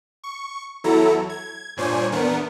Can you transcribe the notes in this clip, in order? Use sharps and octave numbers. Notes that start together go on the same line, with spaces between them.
C#6
E2 F#3 E4 A4 A#5
G#6
G2 A#2 D4 C5 C#5 G#5
E2 B3 D4 A#4 C#7